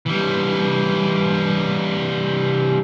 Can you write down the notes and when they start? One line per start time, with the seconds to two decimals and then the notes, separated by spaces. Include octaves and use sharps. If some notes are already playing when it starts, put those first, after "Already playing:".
0.06 E3 G3